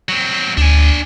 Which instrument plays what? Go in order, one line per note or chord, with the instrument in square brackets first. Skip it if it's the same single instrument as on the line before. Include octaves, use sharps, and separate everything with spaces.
[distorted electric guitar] F#3 C4
[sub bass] D2 [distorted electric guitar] D4 G#5